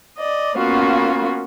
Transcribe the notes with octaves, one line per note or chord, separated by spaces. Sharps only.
D5 D#5
A#3 B3 C#4 F4 F#4